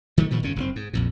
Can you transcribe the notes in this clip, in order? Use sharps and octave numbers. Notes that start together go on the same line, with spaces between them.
D#3 G3 A3
G2 A#2 D#3 F3
G1 F2 C#3 C#4
F#1 C3 C4
G#2
A#1 F2 A#2